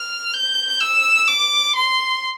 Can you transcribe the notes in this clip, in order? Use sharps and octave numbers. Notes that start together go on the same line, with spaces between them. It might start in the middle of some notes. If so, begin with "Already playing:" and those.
Already playing: F6
G6
E6
D6
C6